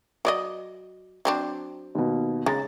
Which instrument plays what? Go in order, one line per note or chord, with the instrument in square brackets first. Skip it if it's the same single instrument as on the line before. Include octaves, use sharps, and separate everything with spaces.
[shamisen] F#3 D5 D#5
F#3 C4 D4
[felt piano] D#2 B2
[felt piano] C#3 A#5 A6 [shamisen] G#3